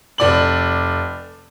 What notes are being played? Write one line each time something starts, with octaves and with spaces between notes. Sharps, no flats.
F1 D5 F#7